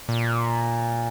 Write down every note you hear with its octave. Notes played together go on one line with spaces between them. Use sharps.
A#2